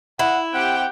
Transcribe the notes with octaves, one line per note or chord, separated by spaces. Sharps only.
E4 F#5
C4 G4 F#5 G5